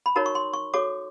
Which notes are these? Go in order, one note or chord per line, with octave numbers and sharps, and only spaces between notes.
B5
D#4 F#4 A#4 C#5 A#5
C#6
C6
C#6
F#4 A4 C#5 D6